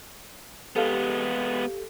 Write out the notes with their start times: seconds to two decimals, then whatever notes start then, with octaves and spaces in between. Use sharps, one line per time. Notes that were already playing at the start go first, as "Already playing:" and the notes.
0.76 G#3 B3 G4 A4 F5